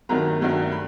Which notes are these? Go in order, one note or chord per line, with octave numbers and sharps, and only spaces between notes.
G2 D#3 F#3 A3 A#5
G2 D#3 F#3 A3
B5